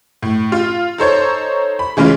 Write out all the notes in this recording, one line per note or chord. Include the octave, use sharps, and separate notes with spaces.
A2
F4
D#4 A4 C5 C#5
B5
C#3 E3 G#3 C#4 F4